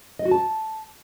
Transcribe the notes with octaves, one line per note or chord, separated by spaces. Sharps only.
D#5
F#4
A5